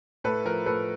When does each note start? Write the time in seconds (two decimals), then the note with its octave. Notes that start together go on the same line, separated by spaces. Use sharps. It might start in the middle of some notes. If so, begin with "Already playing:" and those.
0.24 A2 A4 B4
0.45 F3 A#4
0.66 A2 A4 B4